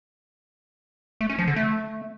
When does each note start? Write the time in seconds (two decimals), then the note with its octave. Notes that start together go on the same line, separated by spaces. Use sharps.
1.21 A3
1.30 C#4
1.38 F3
1.47 D3
1.56 A3